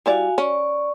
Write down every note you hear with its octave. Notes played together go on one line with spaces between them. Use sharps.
G3 E4 F#4 D5 F5 G#5
C#4 D5 C#6